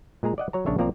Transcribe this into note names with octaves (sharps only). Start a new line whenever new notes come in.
A#2 G#3 G#4 A#5
D5 D#5 F#5
F#3 C#5 A#5
A#1 C#3 D4 C#5 E5
B1 F3 A#3 C4 D5 A#5